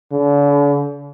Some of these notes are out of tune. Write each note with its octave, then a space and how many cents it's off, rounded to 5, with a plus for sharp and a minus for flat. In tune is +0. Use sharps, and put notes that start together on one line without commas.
D3 -40